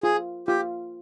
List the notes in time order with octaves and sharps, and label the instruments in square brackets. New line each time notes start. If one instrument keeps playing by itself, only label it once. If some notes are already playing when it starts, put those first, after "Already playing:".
[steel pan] F4 [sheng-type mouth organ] G#4
[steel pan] F4 [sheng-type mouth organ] G4